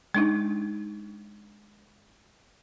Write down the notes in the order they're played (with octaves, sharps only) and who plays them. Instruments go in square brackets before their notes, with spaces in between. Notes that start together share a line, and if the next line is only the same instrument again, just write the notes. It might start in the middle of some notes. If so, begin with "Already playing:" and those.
[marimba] G#3 D4 D#4